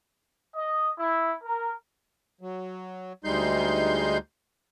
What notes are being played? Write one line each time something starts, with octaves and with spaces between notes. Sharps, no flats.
D#5
E4
A#4
F#3
D2 G3 G#3 D#4 C6 G6